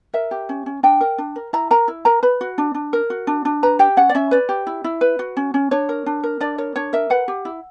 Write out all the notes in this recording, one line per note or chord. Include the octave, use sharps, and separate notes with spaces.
A#4 E5
G4
C#4
C#4
D4 G5
A#4
D4
A#4
E4 A#5
A#4 A#5
E4
A#4 A#5
B4 B5
F#4
D4
D4
A#4
F#4
D4
D4
B4 A#5
G4 G5
C#4 F#5
D5
C#4 E5
B4 D5
G4
E4
E4
B4
F#4
C#4
C#4
D4 C#5
A#4
D4
A#4
D4 D5
A#4 C#5
D4 C#5
A#4 E5
B4 F#5
G4
E4